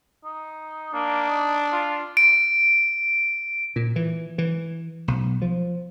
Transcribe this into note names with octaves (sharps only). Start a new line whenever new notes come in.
D#4
A#3 D4
D#4
F4
D7
A#2
E3
E3
B1
F3